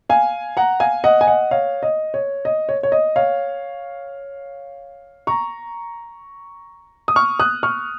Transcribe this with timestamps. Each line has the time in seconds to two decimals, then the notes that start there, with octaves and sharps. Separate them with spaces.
0.09 F5 G#5
0.57 F#5 A#5
0.80 F5 G#5
1.04 D#5 F#5
1.21 G#5
1.27 D#5 F#5
1.51 C#5 F5
1.83 D#5
2.14 C#5
2.45 D#5
2.69 C#5
2.83 C#5
2.92 D#5
3.16 C#5 F5
5.27 A#5 C#6
7.08 D#6
7.16 C#6 F6
7.40 D#6 F#6
7.63 C#6 F6